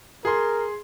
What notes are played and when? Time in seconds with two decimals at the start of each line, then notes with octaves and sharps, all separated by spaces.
0.25 G#4 A#4 C6